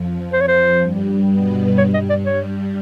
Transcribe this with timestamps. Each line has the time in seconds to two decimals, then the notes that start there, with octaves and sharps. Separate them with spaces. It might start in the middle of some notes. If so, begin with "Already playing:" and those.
Already playing: F2 F3
0.33 C5
0.41 C#5
0.48 C5
0.81 G2 G3
1.29 B2 B3
1.78 G2 G3 C#5
1.94 D#5
2.10 D5
2.26 C#5